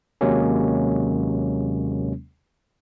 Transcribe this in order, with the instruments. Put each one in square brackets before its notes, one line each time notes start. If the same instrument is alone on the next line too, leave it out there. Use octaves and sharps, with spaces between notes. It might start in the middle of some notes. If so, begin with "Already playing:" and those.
[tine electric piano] D#2 C3 F#3 G#3 A#3 C#4